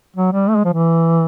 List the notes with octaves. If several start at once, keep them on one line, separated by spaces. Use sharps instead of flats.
F#3
G3
A3
G#3
F3
E3